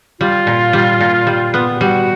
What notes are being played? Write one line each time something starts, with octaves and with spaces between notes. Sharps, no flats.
G3 F4
A#2
G3
A#2
G3
B3
G4
G3 F#4